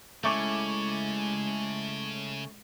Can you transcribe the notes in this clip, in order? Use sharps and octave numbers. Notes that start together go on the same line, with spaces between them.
C#3 G#3 A3 C#4 E4 E5 C#6 D6